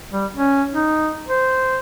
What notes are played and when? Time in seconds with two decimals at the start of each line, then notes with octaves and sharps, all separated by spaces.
0.12 G3
0.36 C#4
0.73 D#4
1.28 C5